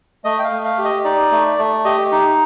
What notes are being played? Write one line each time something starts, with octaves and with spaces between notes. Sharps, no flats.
A3 D#5
G5
F5
A3
F5
G4
D#5
D#4 D5
A3
A3
G4 D#5
D#4